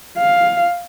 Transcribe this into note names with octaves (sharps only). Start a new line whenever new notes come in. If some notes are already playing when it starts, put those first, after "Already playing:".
F5